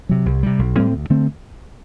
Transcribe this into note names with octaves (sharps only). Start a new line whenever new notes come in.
C3 F#3
C2
C3 G3
B1
A2 G3 C4
D2
D3 A3 C4